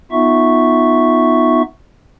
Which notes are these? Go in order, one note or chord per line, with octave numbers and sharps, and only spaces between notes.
B3 D#4 F4 E5 C#6